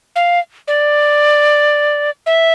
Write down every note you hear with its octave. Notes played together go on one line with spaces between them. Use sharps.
F5
D5
E5